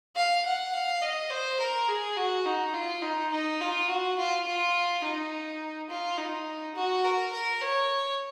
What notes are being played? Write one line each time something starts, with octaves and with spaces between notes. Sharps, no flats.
F5
F#5
F5
D#5
C5
A#4
G#4
F#4
D#4
F4
D#4
D#4
F4
F#4
F4
F4
D#4
F4
D#4
F#4
A#4
A#4
C#5